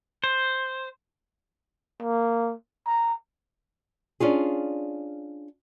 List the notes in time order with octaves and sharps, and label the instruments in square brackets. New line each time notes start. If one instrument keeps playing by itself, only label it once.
[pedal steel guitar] C5
[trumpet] A#3
A#5
[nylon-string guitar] C#4 D4 F4 G#4